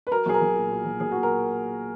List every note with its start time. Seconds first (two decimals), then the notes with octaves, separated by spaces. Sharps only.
0.07 B4
0.11 F#3 A#4
0.26 B1 G#4
0.34 A#4
0.41 B1
0.56 A#2
0.71 F#3
0.85 B1
1.00 B1 G#4
1.11 A#2 F#4
1.23 A#4